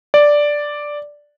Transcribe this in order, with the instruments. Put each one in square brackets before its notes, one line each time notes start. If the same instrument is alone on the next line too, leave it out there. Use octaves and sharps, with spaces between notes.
[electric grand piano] D5